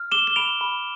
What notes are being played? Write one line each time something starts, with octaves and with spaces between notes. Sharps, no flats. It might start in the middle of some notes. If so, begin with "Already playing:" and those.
Already playing: F6
D6 E7 G7
G7
B5 D7 F7
B5